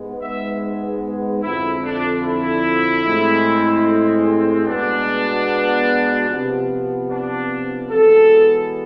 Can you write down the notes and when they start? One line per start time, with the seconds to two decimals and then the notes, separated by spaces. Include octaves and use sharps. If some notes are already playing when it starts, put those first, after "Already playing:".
Already playing: G#2 G#3 B3
0.21 E5
1.42 F2 D3 F3 E4
1.83 D4
2.24 E4
3.04 A2 G#3 C4
4.66 B2 G#3 B3 D4
6.29 C3 F3 B3
7.09 D4
7.91 E2 B2 G#3 B3 A4